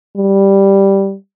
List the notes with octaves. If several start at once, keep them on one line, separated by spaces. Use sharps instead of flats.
G3